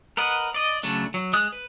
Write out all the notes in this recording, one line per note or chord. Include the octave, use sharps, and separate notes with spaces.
A#4 B4 D#5 F#5
D5 D#5
C#3 F#3 A3 D4
F#3
G#3 D#6 F#6
B4